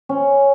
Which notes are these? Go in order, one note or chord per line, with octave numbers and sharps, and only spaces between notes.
C#4